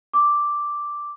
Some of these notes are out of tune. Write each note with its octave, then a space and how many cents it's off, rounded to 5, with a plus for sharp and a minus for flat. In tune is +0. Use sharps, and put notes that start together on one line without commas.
D6 +0